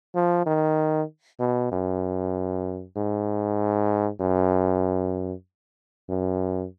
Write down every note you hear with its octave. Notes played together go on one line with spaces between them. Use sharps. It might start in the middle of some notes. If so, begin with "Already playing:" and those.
F3
D#3
B2
F#2
G#2
F#2
F#2